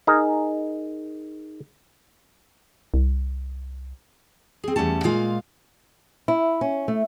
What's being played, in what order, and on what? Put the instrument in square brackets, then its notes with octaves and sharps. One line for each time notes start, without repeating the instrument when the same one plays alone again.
[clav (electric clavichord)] D#4 G#4 A#4
[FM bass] C2
[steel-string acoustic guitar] C4 G#4
E2 G3 A3 C#4 A5
A#2 G#3 F4 F5
[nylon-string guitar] E4
C#4
A3